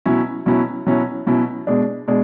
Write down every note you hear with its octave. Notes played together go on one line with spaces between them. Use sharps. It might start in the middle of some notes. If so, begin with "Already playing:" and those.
B2 F#3 C#4 E4
B2 F#3 C#4 E4
B2 F#3 C#4 E4
B2 F#3 C#4 E4
B2 G#3 D4
B2 G#3 D4